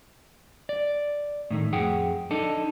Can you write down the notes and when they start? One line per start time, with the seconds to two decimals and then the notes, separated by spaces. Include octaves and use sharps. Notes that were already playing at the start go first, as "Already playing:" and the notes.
0.69 D5
1.50 A2 D#3 A3
1.73 F2 G#4 F#5 G5
2.31 D4 D#4 A4